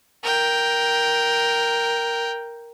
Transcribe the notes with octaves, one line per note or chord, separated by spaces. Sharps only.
A#4 G5